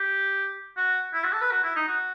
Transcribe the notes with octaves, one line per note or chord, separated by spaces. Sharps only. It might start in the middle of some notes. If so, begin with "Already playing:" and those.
Already playing: G4
F#4
E4
F#4
A4
B4
F#4
E4
D#4
F#4